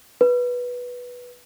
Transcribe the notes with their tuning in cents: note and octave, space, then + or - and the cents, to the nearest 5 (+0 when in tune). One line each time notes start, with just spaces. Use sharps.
B4 -10